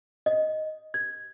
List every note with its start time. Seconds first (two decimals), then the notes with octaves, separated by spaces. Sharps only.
0.26 D#5
0.94 G#6